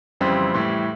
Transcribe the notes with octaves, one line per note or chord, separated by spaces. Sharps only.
F2 C#3 E3 G3 C4
A2 E3 G3